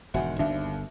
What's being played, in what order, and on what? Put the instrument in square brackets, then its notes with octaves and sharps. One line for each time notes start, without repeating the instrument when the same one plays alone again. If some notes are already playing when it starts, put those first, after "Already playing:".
[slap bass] E1 G#2 D#3 [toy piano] F#4 E5 [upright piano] F#5 G#5
[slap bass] G1 [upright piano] D#2 [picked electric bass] D4 [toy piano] E5 F5